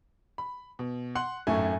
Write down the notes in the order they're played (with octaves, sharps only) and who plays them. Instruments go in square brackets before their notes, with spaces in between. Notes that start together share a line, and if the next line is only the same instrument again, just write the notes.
[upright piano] B5
B2
[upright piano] F#5 F#6 F#7 [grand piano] C6
[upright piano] G#1 A2 C#6 [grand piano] F#2 A3 G#5